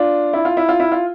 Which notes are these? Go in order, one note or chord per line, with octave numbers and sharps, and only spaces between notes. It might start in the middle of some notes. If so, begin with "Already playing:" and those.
Already playing: D4 F4
E4
F4
E4
F4
E4
F4